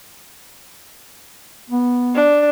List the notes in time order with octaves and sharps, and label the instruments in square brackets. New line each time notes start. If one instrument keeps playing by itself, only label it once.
[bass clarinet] B3
[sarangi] D4